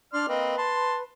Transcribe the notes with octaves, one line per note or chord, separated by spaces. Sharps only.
D4 D5 C6 F6
A#3 C4 B4 D#5
A5 C6